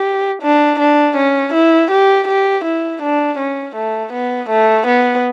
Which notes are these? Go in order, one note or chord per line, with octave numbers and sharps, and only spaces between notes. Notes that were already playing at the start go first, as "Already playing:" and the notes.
Already playing: G4
D4
D4
C#4
E4
G4
G4
E4
D4
C#4
A3
B3
A3
B3